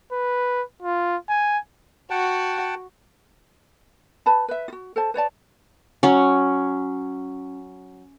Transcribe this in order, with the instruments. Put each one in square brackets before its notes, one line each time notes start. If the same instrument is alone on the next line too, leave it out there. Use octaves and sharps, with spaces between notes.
[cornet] B4
F4
G#5
[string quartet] F#4 [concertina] F#5 G5 A5
[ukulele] B4 A5 B5
B4 E5
F4 F#4
A4 C5 A5
B4 C#5 D5 A5
[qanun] F#3 C#4